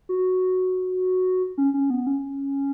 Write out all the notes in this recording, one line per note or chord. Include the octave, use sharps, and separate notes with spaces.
F#4
C#4
C#4
B3
C#4